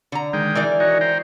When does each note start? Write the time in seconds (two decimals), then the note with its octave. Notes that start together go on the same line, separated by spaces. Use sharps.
0.12 D3 A#5
0.33 D#3 G#3 G5
0.55 E3 A#4 D5
0.80 D#4 F#4 C#5
1.01 C5 G5 A#5